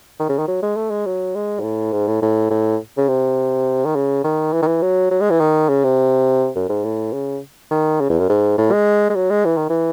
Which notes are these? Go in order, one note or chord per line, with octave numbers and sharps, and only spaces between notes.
D#3
C#3
D#3
F#3
G#3
A3
G#3
F#3
G#3
G#2
A2
G#2
A2
A2
A2
C#3
C3
D#3
C#3
D#3
E3
D#3
E3
F#3
F#3
G#3
E3
D#3
C#3
C3
F#2
G#2
A2
C#3
D#3
C#3
E2
F#2
G#2
A2
G#3
G#3
F#3
G#3
E3
D#3
E3